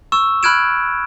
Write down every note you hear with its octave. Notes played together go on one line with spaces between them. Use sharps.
C#6 E6 E7
B5 F6 F#6 G#6 D7 E7